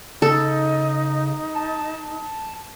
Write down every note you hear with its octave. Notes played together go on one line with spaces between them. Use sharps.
C#3 D#4 A4
A5